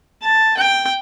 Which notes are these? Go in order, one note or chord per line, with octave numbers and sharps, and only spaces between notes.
A5
G5